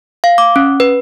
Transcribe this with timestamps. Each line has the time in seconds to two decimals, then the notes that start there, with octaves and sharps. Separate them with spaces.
0.24 F5
0.38 D6
0.56 C#4
0.80 B4